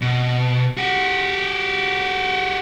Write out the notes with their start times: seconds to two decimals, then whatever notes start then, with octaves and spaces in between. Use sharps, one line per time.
0.01 B2
0.77 F#4 G4